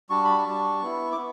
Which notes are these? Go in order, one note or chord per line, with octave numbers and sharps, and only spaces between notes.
G3 D4 F#4 C#6
B5
C#6
G3 D4 F#4
B3 E4
D6
B3